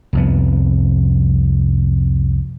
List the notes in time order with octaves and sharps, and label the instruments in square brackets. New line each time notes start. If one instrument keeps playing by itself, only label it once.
[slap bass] C2 F2 B3